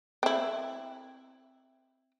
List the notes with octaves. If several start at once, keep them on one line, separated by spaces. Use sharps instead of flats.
C4 E4